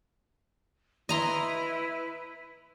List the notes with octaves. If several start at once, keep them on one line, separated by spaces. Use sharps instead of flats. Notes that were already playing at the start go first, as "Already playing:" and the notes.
E4 B4 D#5 A#5 C6